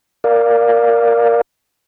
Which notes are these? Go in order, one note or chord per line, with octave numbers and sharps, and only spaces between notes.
A#4 D5 F5